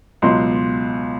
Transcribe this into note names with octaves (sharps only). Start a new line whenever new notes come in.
C#2 B2 F#3 C6